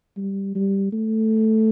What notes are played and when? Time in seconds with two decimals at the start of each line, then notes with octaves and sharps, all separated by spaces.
0.17 G3
0.55 G3
0.92 A3